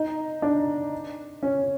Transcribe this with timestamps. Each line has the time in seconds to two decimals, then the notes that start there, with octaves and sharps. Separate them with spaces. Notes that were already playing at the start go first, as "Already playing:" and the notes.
Already playing: D#4
0.42 D4
1.43 C#4